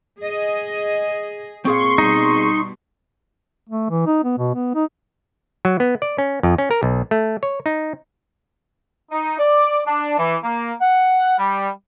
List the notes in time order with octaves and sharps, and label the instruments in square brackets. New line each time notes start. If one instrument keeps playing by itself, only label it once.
[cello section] G#4 D#5
[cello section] A#2 [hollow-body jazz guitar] C4 G#4 F5 [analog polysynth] C6 C#6
[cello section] B2 G3 [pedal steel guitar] D#4
[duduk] A3
E3
D#4
B3
B2
B3
D#4
[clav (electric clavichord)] F#3
B3
D5
C#4
F2
C#4
A#4
B1
A3
C#5
D#4
[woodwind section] D#4
D5
D4
E3
A#3
F#5
G3